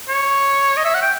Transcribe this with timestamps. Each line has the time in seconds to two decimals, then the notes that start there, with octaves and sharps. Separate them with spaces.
0.09 C#5
0.77 D#5
0.85 E5
0.95 F#5
1.02 G5